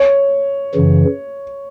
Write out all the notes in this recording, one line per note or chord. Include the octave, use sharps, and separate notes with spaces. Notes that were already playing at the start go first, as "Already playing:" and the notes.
Already playing: C#5
F#2 C#3 E3